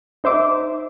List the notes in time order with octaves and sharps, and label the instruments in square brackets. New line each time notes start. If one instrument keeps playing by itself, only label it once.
[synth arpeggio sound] D#4 C5 E5 D6